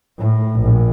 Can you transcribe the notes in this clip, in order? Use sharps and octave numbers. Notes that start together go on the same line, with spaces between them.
A2
A#1